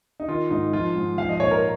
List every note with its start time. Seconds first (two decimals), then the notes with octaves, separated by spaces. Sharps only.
0.20 D#4
0.28 D#3 F4
0.50 G#2 D#4
0.73 F3 F4
0.96 G#2
1.18 F3 F5
1.29 D#5
1.40 A#2 C#5
1.51 A#4